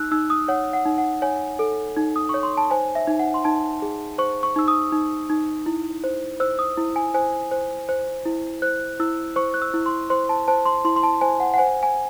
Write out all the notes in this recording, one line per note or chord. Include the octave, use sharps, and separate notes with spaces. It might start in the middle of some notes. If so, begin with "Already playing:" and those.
Already playing: D#4 E6 F#6
D#4 E6
D#6
C#5 F#5
F#5
D#4
F#5
C#5 G#5
A4
D#4
D#6
C#5 C#6
C6
A5
C5 G#5
E5
D#4
F#5
C6
D#4 A5
G#4
C5 C#6
C#6
D#4 E6
D#6
D#4
D#4
E4
C5
C5 E6
D#6
E4
G#5
C5 G#5
C5
C5
E4
C5 F#6
E4 E6
C5 C#6
F#6
E6
E4
C6
C5 C6
A5
C5 A5
C6
E4 C6
C6
A5
C5 G#5
F#5
F#5
C5 G#5
G#5